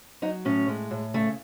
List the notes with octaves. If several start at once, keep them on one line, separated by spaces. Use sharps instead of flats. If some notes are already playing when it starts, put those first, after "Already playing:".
F#3 D#4
A2 C#4
G#3
A2
C#3 A3